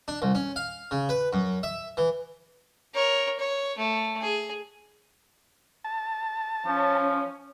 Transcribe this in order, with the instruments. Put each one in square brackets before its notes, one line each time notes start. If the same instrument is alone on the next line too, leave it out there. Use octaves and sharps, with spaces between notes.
[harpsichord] D4
C2
C#4
F5
C#3
B4
F#2
E5
E3
[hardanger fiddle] A#4 C#5
C#5
A3
G#4
[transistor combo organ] A5
[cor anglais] F3 [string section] C#4